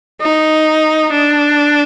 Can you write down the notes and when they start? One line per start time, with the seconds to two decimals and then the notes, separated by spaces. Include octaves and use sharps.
0.21 D#4
1.11 D4